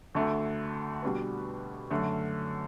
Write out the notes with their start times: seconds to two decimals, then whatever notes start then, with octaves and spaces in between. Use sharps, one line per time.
0.15 D2 D3 A3
1.03 B2 G3 D4 F#4 B4
1.91 F#2 D3 A3